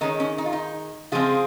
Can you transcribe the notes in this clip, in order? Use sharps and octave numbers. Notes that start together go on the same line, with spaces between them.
D#3 G#3 C#4 D#4
C#4
D#4
F4
D#4
C#3 F3 G#3 C4 F4 G#4